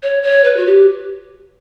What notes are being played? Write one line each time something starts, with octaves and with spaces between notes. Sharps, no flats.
C#5
C#5
B4
F#4
G4